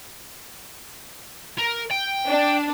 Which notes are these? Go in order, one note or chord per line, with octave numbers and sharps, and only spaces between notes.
A#4
G5
D4